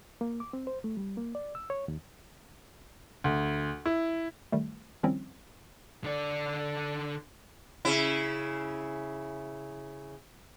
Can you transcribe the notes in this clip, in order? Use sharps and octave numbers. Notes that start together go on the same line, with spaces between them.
A#3
D6
C4
C5
A3
G3
A#3
D5
E6
C#5
D#2
D2
E4
D#3 G3 A3
D#3 F3 G3 C4 C#4 E4
D3 D5
C#3 E4